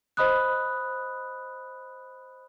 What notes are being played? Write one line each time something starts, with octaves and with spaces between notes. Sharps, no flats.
C5 D#5 B5 D#6 F#6